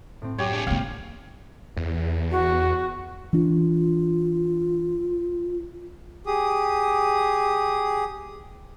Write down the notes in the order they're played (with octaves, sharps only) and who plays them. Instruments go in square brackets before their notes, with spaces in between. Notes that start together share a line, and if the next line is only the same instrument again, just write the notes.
[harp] A2 C4
[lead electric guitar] F#2 [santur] G4 C#5
[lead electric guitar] D4 G#4
[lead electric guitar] C#2 [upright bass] E3 A#3 [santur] F5
[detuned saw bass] E2
[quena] F#4
[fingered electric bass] E3 D4 [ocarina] F4
[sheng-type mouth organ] G4 G#4 D#6